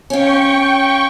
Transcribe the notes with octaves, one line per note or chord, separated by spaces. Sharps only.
C#4 F4 G5 C#6